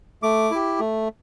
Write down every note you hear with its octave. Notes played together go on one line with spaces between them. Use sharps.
A3 D6
E4 G4
A3